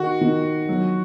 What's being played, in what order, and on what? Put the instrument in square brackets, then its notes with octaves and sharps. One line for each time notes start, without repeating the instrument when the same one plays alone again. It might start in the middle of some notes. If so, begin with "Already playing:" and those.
Already playing: [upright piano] D#3 [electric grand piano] F#4
[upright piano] D#3
F#3